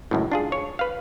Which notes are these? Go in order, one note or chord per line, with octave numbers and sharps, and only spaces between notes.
C#2 F#2 A2
D4 F4 G#4
C#5
B4 F5